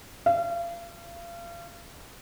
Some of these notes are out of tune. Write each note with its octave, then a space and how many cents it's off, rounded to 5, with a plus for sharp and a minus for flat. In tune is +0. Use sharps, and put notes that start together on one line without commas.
F5 -35